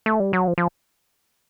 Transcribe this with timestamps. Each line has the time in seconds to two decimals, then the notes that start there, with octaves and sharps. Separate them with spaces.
0.06 A3
0.20 G3
0.33 F#3
0.48 F3
0.58 F3